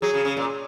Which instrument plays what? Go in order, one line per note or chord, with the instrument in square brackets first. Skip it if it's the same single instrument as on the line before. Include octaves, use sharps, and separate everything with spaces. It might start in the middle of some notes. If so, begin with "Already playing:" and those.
[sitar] F#3 [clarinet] G#4
[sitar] C#3
C#3
A#2